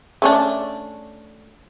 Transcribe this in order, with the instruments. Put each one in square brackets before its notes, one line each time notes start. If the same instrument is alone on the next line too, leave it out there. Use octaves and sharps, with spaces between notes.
[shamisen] A3 C#4 D4